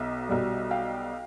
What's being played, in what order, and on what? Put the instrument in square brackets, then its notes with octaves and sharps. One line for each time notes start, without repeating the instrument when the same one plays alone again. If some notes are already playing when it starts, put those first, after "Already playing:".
Already playing: [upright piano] B1 B2 F#3 E5
B1 B2 G3
F5 G5